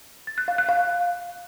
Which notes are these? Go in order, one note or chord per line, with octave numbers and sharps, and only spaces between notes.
A6
F#6
F5
F#6
F5